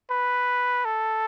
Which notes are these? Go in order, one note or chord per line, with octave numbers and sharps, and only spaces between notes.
B4
A4